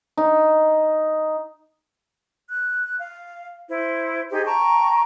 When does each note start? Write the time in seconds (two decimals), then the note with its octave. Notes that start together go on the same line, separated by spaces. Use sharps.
0.17 D#4
2.50 F#6
2.99 F5
3.69 E4 C5
4.31 D#4 G4 G#4 C5
4.46 G5 A5 A#5 C#6